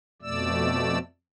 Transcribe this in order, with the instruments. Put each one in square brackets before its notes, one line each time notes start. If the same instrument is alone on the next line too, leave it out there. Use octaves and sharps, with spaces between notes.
[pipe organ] F2 B2 A3 D5 E6